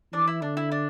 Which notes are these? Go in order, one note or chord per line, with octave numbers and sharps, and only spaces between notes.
E3 D4 D5
E4
D3 D4
E4
D4